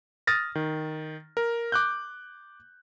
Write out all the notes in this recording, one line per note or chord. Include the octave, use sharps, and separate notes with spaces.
D#6 F6 A6 A#6
D#3
A#4
D6 F#6 G6